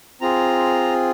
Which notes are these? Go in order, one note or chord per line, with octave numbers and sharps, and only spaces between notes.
C4 F4 G#4 A#5